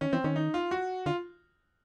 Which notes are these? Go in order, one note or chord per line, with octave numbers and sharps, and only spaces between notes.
D#3 C#4
E3 C4
D#3 C#4
D#4
F4
F#4
D3 F4